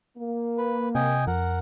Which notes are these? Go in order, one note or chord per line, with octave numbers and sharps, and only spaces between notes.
A#3
B4
C3 D#5 G5 G#5
F2 A#4 F#5